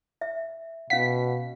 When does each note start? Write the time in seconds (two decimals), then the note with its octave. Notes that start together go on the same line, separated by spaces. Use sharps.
0.21 E5
0.90 B2 C#4 F5 F#5 B6